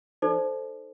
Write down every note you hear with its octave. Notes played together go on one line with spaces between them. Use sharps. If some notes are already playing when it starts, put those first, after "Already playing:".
D#4 A4 C5 D5